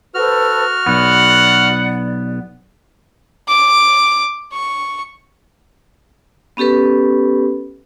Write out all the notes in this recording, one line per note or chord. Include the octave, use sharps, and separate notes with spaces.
F#4 A4 B4 C5 F6
B1 B3 D5 F#5
D6
C#6
B3 C#4 G4 A4 B4